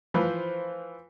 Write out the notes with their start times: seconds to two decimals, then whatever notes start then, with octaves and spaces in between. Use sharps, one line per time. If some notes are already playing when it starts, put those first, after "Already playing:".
0.14 E3 F3 B4 C5